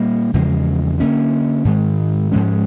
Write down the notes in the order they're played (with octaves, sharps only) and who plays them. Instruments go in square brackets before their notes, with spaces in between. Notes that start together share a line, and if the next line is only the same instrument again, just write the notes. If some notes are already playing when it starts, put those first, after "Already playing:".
Already playing: [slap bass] A#2 G3 A#3
E2 C#3 F3 G#3
D3 F3 A#3 C#4
G#2 D#3 G#3
G#2 F3 G#3 C#4